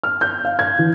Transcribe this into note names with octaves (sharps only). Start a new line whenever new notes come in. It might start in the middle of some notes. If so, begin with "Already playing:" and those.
F6
G6
F5
G#6
E3